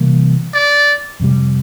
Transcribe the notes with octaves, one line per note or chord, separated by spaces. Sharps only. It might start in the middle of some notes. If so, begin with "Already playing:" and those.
Already playing: C3 E3 G3 A#3
D5
F2 C3 G3